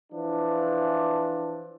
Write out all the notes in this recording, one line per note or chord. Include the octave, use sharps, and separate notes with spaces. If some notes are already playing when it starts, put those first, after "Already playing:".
E3 F3 D4